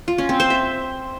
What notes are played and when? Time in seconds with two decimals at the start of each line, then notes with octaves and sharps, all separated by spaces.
0.08 F4
0.18 C#4
0.29 C4
0.40 C5
0.50 E5